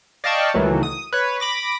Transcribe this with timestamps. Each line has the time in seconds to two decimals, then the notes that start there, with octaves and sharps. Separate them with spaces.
0.24 D5 D#5 F5 G5 A5 C#6
0.54 C#2 D#3 E3 F#3 A3
0.83 D#6
1.13 B4 C#5
1.40 B5 D6 A#6